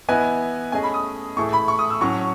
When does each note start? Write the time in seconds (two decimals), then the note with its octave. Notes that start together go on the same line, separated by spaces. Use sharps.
0.08 E3 B3 E4 B4 D#5 G#5
0.72 A3 C#4 G#4 D#5 G#5
0.83 B5
0.94 D#6
1.37 A2 E3 A3 E4 G#4 C#6
1.53 B5
1.68 C#6
1.79 D#6
1.90 E6
2.01 A2 F#3 C#4 C#6